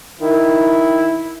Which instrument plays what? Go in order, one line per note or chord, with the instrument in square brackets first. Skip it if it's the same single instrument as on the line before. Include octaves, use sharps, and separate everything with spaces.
[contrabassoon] D#3 [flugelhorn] E4